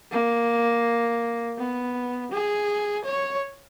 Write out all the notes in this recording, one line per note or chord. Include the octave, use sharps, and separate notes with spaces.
A#3
B3
G#4
C#5